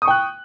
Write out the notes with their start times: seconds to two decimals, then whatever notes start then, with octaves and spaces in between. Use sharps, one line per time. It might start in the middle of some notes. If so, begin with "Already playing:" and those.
0.02 D#6
0.05 C#6
0.08 G5
0.10 F#6